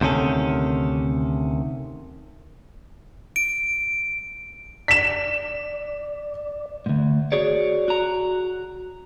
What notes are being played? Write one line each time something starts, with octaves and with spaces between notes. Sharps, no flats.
D2 C3 D#3 C#4 A4
D7
D5 B6 E7
D2 G#2
F#4 G#4 C#5 D5
F#4 A#5